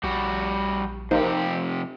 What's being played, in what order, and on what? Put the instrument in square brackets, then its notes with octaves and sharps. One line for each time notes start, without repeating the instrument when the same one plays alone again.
[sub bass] A#1 [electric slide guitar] G3 F#4
[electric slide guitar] F2 C3 G4 [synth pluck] A#3 D#4 C5